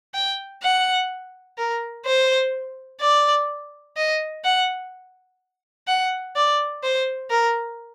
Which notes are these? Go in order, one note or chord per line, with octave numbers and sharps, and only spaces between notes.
G5
F#5
A#4
C5
D5
D#5
F#5
F#5
D5
C5
A#4